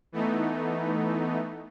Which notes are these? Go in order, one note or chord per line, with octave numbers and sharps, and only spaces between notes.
E3 A3 B3 D#4